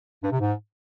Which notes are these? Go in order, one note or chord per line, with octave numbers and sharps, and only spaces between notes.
G2
C3
G#2